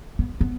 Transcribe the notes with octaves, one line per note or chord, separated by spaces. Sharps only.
B3
B3